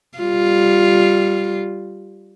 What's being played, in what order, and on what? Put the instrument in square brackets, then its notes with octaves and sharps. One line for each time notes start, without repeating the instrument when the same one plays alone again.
[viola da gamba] G3 F4